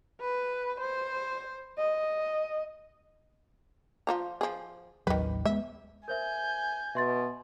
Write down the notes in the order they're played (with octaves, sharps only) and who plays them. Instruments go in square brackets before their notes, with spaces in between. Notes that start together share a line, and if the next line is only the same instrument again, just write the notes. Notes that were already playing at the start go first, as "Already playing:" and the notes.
[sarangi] B4
C5
D#5
[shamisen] F3 F4 A#5
F3 G#4
[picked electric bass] A1 D#2 F#3 [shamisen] D#3 B4
[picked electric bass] G#3 B3 [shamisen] E5
[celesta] A#4 C5 E5 [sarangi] G#5 [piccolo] G6
[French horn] B2 [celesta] E5 C6 A6